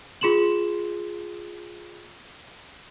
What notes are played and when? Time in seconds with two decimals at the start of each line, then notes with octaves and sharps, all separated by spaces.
0.21 F4 G#4 C6 E7 F#7